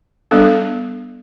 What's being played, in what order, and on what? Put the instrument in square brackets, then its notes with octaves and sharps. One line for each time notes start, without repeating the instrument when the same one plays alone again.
[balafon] G3 B3 D4 A4